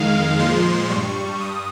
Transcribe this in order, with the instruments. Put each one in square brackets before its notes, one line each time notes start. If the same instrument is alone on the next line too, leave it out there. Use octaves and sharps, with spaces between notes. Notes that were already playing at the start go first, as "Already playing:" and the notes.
Already playing: [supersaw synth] F2 D#3 G#3 F5
A#2 F3 G#3 C6
G2 G3 C#6
G2 D#6